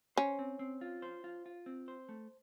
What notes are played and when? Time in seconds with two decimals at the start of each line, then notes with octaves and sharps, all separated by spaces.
0.16 C#4 C5
0.39 C4
0.59 C4
0.81 F4
1.02 C5
1.24 F4
1.46 F4
1.66 C4
1.88 C5
2.09 A3